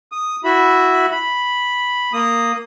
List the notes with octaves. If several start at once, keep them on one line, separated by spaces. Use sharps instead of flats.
D#6
E4 F#4 E5 B5
B5
A#3 D#6